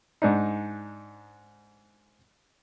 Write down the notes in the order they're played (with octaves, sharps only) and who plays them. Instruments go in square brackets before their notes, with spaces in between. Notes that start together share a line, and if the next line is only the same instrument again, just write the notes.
[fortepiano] G#2 D4 D#4